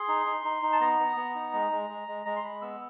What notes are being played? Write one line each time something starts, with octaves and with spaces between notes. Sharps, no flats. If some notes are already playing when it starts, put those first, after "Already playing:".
Already playing: G#4 C6
D#4
D#4
D#4
D#4
A5
B3 A#5
B3
B3
D#4
G#3
G#3
G#3
G#3
G#3 A#5
C6
G#3 B5
B3 E6